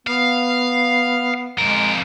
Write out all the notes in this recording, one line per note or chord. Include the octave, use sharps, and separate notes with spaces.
B3 F5
F2 G#3 A#4